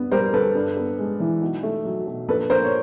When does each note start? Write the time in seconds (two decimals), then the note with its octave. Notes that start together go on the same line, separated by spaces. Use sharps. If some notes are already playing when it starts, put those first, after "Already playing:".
Already playing: G2 B3
0.11 G3 A#4 C5
0.33 D3 A4 B4
0.55 G2
0.77 B3
0.98 G#3
1.20 E3
1.42 B1
1.63 A3
1.85 F#3
2.07 B2
2.28 A#1 A4 B4
2.50 A#1 A#4 C5
2.64 C#5